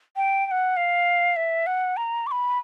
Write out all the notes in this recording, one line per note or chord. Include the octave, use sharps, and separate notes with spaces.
G5
G5
F#5
F5
E5
F#5
A#5
D6
B5